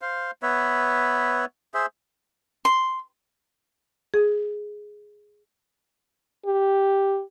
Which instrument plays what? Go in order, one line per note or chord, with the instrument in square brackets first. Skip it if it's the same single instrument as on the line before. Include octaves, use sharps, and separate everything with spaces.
[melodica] C5 F5
B3 B4 C#5 E5
G#4 C5 E5
[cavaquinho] C6
[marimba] G#4
[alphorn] G4